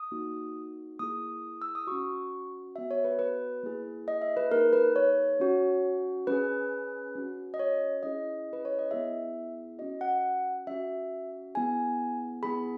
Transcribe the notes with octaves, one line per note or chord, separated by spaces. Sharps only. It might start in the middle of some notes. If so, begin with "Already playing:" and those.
Already playing: D#6
A#3 D#4 F#4
A#3 E4 G#4 D#6
E6
D#6
C#4 F#4 C#6
B3 F#4 E5
C#5
B4
B4
A#3 E4 G#4
D#5
E5
B4
A#3 D#4 G#4 A#4
B4
C#5
C#4 F#4
C#4 G#4 B4
C#4 F#4
D#5
C#5
C#4 E4 G#4 D#5
B4
C#5
D#5
B3 E4 G#4 E5
C#4 F#4 D#5
F#5
C#4 F#4 E5
B3 E4 G#4 G#5
B3 E4 G#4 B5